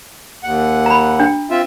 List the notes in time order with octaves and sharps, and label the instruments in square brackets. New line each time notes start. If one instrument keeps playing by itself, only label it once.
[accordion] D#2 F#5
[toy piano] A#5 B5
D4
[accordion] C4 F4 E5